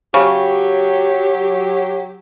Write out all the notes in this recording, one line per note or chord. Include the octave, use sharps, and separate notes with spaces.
C#3 F#3 G4